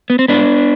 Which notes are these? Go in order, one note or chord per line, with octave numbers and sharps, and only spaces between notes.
B3
C4
G#2 B3 D4